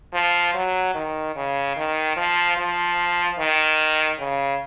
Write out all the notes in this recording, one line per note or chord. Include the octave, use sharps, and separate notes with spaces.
F3
F#3
D#3
C#3
D#3
F3
F3
D#3
C#3